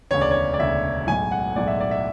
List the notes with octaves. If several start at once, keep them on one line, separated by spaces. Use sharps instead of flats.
E1 D2 C#3 C#5
D5
C#5
D5
E1 D2 C#3 E5
B1 A2 G#3 G#5
F#5
B1 A2 G#3 D5
E5
D5
E5